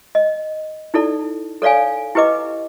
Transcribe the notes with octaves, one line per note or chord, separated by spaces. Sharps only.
D#5
D#4 E4 A4 D5
A4 C#5 D5 F5 G#5
E4 G4 B4 D#5 D6